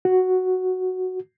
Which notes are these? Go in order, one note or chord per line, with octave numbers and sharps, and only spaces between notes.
F#4